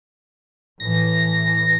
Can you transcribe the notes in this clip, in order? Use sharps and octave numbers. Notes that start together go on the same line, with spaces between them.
A2 E3 A#6